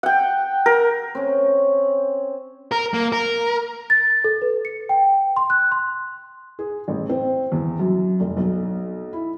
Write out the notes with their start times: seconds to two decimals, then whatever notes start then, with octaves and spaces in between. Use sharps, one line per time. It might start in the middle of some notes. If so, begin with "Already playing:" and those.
0.03 F#5 G5
0.66 A#4
1.15 C4 C#4
2.72 A#4
2.94 A#3
3.13 A#4
3.90 A6
4.24 A4
4.42 B4
4.65 C#7
4.89 G5
5.36 C6
5.50 F#6
5.72 C6
6.59 G#4
6.88 A1
7.09 C4
7.52 E2
7.79 F#2
8.20 F1
8.37 B1
9.13 E4